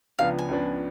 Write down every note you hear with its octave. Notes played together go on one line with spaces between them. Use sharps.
C#2 C#3 F3 B3 D4 F5
G#5
C#2 C#3 F3 B3 D4